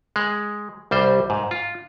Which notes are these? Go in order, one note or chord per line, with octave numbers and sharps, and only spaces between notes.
G#3
C2 G3 C5
G#2
F4